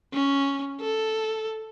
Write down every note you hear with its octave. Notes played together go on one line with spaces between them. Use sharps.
C#4
A4